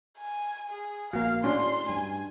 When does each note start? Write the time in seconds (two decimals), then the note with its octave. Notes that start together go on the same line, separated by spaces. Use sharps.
0.19 G#5
0.69 G#4
1.13 A#1 A#3 F#4 F5
1.44 A2 C#4 D4 F#4 C6
1.89 G2 G#5